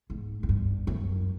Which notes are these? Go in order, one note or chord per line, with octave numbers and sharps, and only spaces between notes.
G#2
G#2
G2
F#2